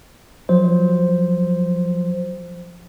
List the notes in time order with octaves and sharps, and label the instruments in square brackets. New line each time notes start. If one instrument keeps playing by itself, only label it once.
[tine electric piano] F3 F#3 C5